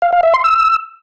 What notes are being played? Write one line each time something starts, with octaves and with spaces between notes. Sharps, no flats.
F5
F5
E5
C6
E6